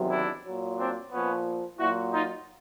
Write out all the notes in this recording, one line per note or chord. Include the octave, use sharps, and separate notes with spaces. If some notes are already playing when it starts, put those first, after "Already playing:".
Already playing: E2 C3 D#3 F#3
D4 E4
A#2 F#3
C4 D4
A#2 F3 B3 C#4
A#2 F#3 E4 F#4
D#4 F4